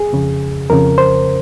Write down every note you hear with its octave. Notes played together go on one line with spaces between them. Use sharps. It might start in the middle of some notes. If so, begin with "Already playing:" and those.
Already playing: G#4
F2 C#3
F2 C#3 A#4
C5